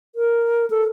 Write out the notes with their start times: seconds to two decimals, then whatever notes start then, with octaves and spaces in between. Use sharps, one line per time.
0.15 A#4
0.70 A4